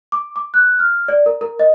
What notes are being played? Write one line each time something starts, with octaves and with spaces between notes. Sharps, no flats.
D6
D6
F#6
F6
D5
A#4
A#4
D#5